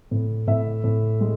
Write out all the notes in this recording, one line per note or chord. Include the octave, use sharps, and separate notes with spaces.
A2
A2 E5
A2
G#3